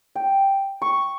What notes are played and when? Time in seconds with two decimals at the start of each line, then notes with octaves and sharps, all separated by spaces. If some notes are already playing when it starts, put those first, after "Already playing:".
0.15 G5
0.82 C#6